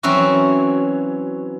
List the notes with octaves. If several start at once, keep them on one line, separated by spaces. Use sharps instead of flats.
E3 F#3 C4 C#4 E4 F#4